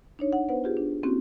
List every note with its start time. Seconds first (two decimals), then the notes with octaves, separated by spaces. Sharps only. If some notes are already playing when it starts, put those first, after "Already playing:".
0.19 D4 D#4 C#5
0.33 F#5
0.49 B3 B4 C5 F#5
0.64 F4 G4 G#4
0.77 D4
1.03 A#3 C4 C#4 E4 F#4 G4